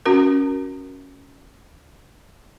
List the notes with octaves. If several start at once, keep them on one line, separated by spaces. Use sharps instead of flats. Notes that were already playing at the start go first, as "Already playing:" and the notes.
C#4 F#4 A#4